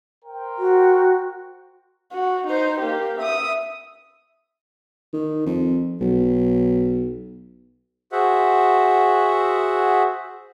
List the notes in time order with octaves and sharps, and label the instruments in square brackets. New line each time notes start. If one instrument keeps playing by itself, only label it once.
[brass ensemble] A#4 C5 G5
[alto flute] F#4
[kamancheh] F#4
D#4 C5
A#3 G4
E5 D#6
[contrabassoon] D#3
F2
B1
[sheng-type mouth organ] F#4 G#4 C5 E5 F#5